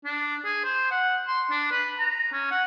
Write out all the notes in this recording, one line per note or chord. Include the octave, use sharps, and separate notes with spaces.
D4
G#4
C5
F#5
C6
D4
B4
A#5
C#4
F#5